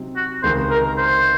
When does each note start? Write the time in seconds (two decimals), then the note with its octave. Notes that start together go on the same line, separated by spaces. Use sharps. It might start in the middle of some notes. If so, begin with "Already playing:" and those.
Already playing: C3 F#3 C4 D#4
0.17 F#4
0.43 C#2 C3 D#3 G#3 C5
0.71 A#4
0.98 C5